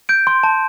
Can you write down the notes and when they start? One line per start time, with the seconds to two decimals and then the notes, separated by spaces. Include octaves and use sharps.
0.09 G6 D7
0.27 C6
0.43 A5